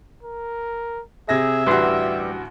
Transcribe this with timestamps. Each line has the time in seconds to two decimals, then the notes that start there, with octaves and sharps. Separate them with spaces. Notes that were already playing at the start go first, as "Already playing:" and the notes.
0.23 A#4
1.29 C3 G#4 E5 G#6 A#6
1.67 A1 D2 G3 F#4 G4 B4 C6